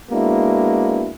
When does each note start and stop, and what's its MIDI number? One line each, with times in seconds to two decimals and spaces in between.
0.11 1.11 56
0.11 1.11 58
0.11 1.11 59
0.11 1.11 62
0.11 1.11 64
0.11 1.11 66